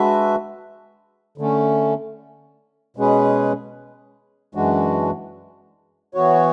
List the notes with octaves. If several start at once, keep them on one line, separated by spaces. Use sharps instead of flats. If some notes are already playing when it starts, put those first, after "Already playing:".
Already playing: G#3 D4 F#4 B4 E5
D3 A3 C#4
B2 G#3 C#4 G#4 B4
F#2 E3 G#3 D4 F#4
E3 B3 F#4 C#5